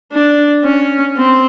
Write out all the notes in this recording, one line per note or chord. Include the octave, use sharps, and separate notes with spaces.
D4
C#4
C4